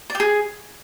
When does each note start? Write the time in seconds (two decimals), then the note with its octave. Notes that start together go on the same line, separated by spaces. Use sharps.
0.10 D5
0.15 G4
0.20 G#4